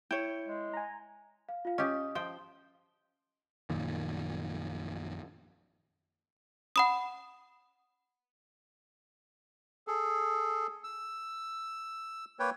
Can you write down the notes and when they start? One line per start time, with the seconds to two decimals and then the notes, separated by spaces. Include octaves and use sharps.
0.11 E4 C#5 G5
0.47 G#3
0.73 G#5 A#5
1.49 F5
1.65 F4 F5
1.78 C#4 G4 D#5 D#6
2.15 F3 G5
3.70 A#1 F#2 A#2 D#3
6.76 F#5 B5 D#6
9.87 G#4 A4
10.84 E6
12.39 A#3 B4 C#5 G5